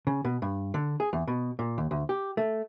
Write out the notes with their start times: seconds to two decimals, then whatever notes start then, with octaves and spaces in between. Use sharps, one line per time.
0.07 C#3
0.25 B2
0.42 G2
0.74 D3
1.00 G#4
1.13 E2
1.27 B2
1.59 A#2
1.78 D#2
1.91 D2
2.09 G4
2.37 A3